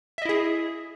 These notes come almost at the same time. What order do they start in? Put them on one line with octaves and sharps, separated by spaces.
E5 D#5 E4 G#4